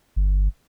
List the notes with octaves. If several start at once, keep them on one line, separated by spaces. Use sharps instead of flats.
G1